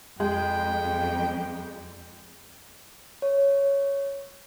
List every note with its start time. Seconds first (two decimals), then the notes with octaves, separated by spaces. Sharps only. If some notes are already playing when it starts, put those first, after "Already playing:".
0.20 F2 G#3 G5
3.22 C#5